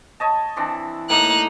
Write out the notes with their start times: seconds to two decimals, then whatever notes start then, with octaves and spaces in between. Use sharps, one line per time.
0.20 C#5 D#5 A5
0.57 E3 C4 D4
1.09 A2 A#3 D#4 F#6